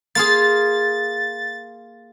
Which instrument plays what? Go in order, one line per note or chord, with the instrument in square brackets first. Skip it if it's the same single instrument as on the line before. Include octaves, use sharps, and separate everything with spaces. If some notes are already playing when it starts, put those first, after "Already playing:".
[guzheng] A#3 F4 G#4 [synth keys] A6